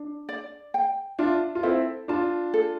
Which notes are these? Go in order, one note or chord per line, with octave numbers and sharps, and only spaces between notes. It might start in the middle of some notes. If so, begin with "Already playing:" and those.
Already playing: D4
D5
G5
D4 F4 E5
F4
C4 E4 A4
D4 F4 A5
A4